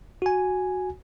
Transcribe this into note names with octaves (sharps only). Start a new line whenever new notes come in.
F#4 G#5